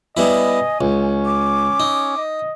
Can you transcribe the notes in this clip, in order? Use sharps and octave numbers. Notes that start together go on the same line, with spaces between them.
G3 B3 E4 D#5 G#5
C#2 C#4
D6
D#4
D#5